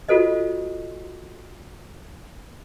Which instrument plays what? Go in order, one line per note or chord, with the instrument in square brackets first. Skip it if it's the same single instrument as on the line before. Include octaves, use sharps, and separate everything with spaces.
[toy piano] F4 F#4 A4 C5 D#5